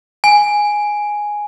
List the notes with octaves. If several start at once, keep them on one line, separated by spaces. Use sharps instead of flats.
G#5